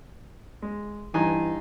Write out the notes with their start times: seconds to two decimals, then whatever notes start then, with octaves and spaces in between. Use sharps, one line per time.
0.62 G#3
1.14 G2 E3 D#4 G#5